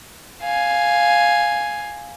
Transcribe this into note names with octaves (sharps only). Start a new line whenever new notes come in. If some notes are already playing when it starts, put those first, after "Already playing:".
F5 G#5